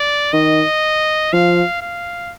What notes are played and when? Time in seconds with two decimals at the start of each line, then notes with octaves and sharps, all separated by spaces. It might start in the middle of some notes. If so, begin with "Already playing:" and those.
Already playing: D5
0.33 D#3 D#5
1.33 F3 F5
1.81 F5